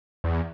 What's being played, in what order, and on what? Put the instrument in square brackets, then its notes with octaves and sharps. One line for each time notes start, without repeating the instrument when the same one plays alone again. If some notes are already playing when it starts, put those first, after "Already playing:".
[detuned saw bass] E2